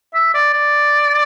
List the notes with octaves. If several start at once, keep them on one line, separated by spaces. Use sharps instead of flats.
E5
D5
D5